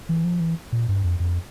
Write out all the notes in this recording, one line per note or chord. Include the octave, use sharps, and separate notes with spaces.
E3
F3
E3
A#2
G2
F2
F2